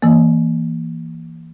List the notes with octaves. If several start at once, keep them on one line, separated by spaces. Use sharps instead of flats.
E3 A#3